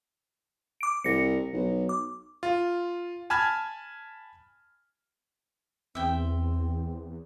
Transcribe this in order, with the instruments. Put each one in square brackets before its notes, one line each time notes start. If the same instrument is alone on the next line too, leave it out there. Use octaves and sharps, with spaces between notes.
[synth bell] D6 D7
[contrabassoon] C2 [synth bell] A#6 C#7
[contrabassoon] B1
[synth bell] D6
[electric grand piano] F4
G#5 A5 B5 F6 G#6
[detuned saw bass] E2 [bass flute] C4 [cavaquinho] E5 G5